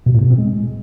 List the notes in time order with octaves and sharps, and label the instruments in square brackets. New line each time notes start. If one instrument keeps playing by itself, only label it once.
[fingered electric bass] B2
A2
B2
C4
G#3